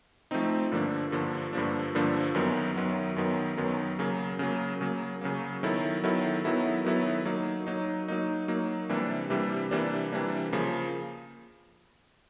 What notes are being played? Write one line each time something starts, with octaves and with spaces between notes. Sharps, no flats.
F3 A3 C4 D#4
G2 D3 F3 A#3 D4
G2 D3 F3 A#3 D4
G2 D3 F3 A#3 D4
G2 D3 F3 A#3 D4
F#2 D#3 F#3 B3
F#2 D#3 F#3 B3
F#2 D#3 F#3 B3
F#2 D#3 F#3 B3
C#3 F#3 A#3
C#3 F#3 A#3
C#3 F#3 A#3
C#3 F#3 A#3
D#3 F#3 B3 E4 A4
D#3 F#3 B3 E4 A4
D#3 F#3 B3 E4 A4
D#3 F#3 B3 E4 A4
F#3 A#3 D#4
F#3 A#3 D#4
F#3 A#3 D#4
F#3 A#3 D#4
C3 E3 G3 A#3 D4
C3 E3 G3 A#3 D4
C3 E3 G3 A#3 D4
C3 E3 G3 A#3 D4
C#3 F3 A#3